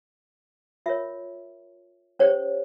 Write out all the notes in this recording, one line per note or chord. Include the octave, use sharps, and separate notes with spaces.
F4 A#4 C#5 E5
C#4 G4 C5 C#5